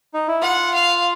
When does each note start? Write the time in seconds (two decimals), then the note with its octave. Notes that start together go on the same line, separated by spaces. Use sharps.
0.14 D#4
0.28 E4
0.41 F4 F#5
0.74 F5